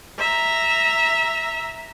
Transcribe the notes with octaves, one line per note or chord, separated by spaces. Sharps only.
E5 A#5